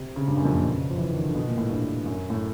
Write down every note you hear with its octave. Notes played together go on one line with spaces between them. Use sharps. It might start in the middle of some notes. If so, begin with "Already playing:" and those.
Already playing: C3
C#3
G2
F#2
F2
A#2
B2
C#3
F3
E3
D#3
D3
B2
A#2
A2
G2
F#2
A2